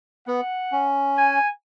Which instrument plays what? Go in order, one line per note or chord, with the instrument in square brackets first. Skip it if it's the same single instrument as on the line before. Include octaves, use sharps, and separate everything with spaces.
[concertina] B3 [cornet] F#5
[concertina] C#4
[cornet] G#5